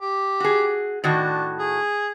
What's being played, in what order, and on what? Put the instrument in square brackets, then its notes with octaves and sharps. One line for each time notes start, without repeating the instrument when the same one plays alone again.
[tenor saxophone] G4
[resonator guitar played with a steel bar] F#4 G#4
[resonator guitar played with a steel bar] A2 D#3 F#4 [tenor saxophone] D4
[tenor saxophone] G#4